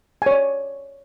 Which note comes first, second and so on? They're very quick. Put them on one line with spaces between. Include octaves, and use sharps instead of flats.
G#5 C#5 D5